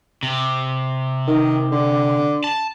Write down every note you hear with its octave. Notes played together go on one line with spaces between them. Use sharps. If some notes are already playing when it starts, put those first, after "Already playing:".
C3
D#3
D3
A5